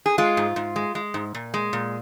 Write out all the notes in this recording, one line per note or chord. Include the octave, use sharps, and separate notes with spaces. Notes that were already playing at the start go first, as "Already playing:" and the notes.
G#4
G#3 F4
G#2
G#2
G#3
G#3
G#2
A#2
G#3
A#2